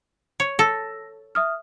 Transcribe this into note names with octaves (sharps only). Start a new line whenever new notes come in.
C#5
A4 A#6
E5 D#6 F6